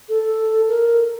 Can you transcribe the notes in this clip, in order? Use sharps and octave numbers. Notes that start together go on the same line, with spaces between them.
A4
A#4